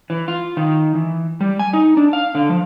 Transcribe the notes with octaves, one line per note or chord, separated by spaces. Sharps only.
E3
F4
D#3
E3
G3
G#5
D#4
D4
F5
D3
F3